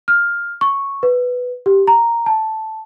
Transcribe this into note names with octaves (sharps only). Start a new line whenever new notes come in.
F6
C#6
B4
G4
A#5
A5